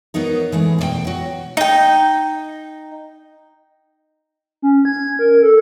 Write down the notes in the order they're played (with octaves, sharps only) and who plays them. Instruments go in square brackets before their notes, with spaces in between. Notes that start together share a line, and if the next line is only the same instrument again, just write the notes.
[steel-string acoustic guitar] F#3 A#3 B3 D#4 A#4
E3 G#3 A3
B2 D5 G5
F#3 F#4
[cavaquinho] D#4 G5
[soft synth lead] C#4
G#6
A#4
A4